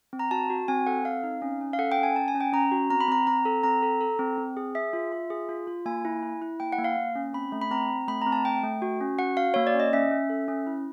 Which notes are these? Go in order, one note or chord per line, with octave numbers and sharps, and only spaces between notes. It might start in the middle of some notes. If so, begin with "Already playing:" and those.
C4
A#5
F#4 A5
F#4
C4 G#5
A4 F#5
C4 F5
D#4
C#4
C#4
F5
A4 F#5
G5
C#4
G#5
C#4 A5
G#5
C#4
G5
C#4 A#5
F#4
C4 A#5
B5
C4 A#5
C4 A#5
A4
C4 A#5
A4
A4
C4
C4
G#4
G#4 E5
F4
F4
G#4
F4
F4
A#3 G#5
E4
E4
E4
A#3 G5
F#5
A#3
F5
A#3
C#4
C4 B5
A3
B5
C4 A#5
C4
A3 B5
C4 A#5
A5
A3 G5
A3
F#4
C#4
F#4 F#5
F#4 F5
A#3 C#5
D5
C#4
D#5
C#4 E5
C#4
A4
C#4
E4